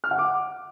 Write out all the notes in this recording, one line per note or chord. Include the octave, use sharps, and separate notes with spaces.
F6
F#5
D6